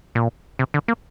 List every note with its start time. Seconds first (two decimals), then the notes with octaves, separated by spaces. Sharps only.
0.15 A#2
0.59 C3
0.74 D3
0.88 A#3